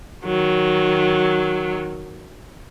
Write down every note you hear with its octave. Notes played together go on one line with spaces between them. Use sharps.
D#3 F#3